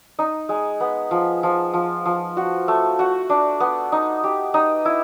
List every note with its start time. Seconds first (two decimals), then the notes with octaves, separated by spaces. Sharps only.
0.19 D#4
0.49 G#3
0.80 B3
1.11 F3
1.43 F3
1.73 F3
2.05 F3
2.37 F#4
2.68 A3
2.99 F#4
3.30 D4
3.60 B3
3.92 D#4
4.24 G4
4.54 D#4
4.85 E4